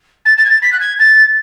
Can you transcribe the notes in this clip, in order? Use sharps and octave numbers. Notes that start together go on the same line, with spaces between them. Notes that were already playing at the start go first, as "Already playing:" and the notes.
A6
A6
G#6
A6
B6
F#6
G#6
A6